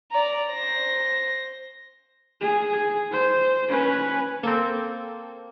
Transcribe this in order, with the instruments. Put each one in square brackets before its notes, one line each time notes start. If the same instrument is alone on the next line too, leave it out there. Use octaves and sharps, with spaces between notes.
[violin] D5 A#5
C5 A#6
[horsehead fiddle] G#4
C5
C#4 B4
[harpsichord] A#3 [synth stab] C4 A4